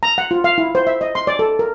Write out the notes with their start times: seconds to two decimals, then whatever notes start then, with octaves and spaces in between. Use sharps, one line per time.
0.03 A#5
0.18 F#5
0.31 F4
0.44 F5
0.58 E4
0.75 C5
0.87 E5
1.01 D#5
1.15 C6
1.27 D5
1.39 A4
1.59 A#4